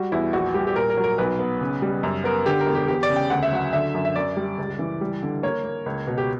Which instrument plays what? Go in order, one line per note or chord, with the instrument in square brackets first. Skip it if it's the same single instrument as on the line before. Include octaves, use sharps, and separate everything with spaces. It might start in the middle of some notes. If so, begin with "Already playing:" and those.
Already playing: [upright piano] G3 F#4
E2 E4
A#1 F#4
G3 G4
G4
A#2 A#4
A#4
F#3
A#4
B1 B4
B3
C#3
G3
F#2
B3 A#4
D3 G4
A#4
E1
G4
E2 G4
D5
C#3
G5
D2 F#5
E5
F#3 F#5
D3 E5
F#2
E5
F#2 D5
G3
C#2
E3
G3
D3
A#3 C#5
A#3
C#2
B2
G4